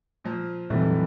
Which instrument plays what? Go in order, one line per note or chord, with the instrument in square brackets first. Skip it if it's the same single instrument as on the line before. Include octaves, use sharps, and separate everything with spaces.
[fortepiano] A#2 F3
[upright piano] F1 [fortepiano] F#2 A3 [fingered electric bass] A#2 D#3 G3 [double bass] E3